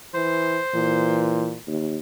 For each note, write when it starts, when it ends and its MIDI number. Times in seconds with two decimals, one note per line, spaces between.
0.14 0.59 52
0.14 1.53 72
0.74 1.57 46
0.74 1.55 52
1.67 1.98 39